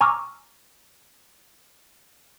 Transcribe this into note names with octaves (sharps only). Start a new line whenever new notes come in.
G#5 A#5 C#6 D6 E6 F6